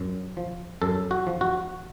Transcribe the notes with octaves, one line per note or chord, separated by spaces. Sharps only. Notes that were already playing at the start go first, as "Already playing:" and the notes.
Already playing: F#2
F3
F#2 A4
F#4
F3
F#4